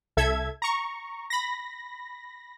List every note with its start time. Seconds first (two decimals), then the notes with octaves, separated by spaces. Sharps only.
0.17 C2 A4 E5 G#6
0.62 A#5 C#6
1.30 B5 A#6